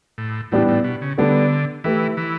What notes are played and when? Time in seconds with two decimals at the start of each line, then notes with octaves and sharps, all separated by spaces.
0.18 A2
0.52 A2 E3 G3 B3 D4 G4
0.68 A2
0.84 B2
1.02 C#3
1.18 D3 G3 B3 D4 A4
1.84 E3 A3 E4 G4 B4
2.17 E3